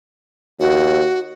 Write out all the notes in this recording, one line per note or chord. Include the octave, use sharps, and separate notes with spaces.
D#2 F#4